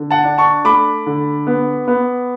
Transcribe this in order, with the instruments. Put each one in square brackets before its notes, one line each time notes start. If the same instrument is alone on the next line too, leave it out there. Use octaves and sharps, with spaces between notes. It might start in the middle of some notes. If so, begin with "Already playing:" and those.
Already playing: [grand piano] D3
F#5 A5
D4
A5 C#6
A3 B5 D6
D3
B3
B3